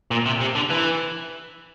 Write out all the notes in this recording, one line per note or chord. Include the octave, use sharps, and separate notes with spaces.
A#2
C3
C3
D3
E3